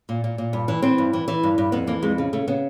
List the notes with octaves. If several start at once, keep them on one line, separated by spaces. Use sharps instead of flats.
A#2
A#2
A#2
G2
E3
E3 C4
G2
E3
E3
G2
G2
F2 B3
E3 A#3
F2 G#3
C#3
C#3 A3
C#3 B3